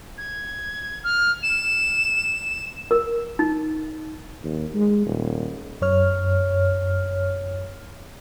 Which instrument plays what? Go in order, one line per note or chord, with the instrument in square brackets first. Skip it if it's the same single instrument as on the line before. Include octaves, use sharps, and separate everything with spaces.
[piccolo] G#6
F6
E7
[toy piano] A#4
D#4
[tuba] D#2
G#3
D#1
[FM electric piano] F#2 C#5 F6